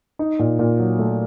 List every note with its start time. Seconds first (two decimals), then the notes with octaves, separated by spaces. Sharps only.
0.19 D#4
0.39 A#2
0.59 A#2
0.79 F#3
0.99 A3